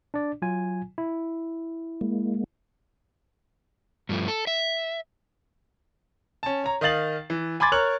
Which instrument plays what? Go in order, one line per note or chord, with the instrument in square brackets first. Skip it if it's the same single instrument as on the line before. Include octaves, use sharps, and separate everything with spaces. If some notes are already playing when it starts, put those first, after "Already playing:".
[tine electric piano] D4 D5
F#3 F4 G#5
E4
[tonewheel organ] G#3 A#3
[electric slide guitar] G2 F3 A3
A4
E5
[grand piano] C#4 A5
C#5 A#5
D#3 D#5 F5 A6 F#7
E3
G#5 B5 C6 D6 G#6 A6
A#4 C#5 C#6 F6 F#6 F#7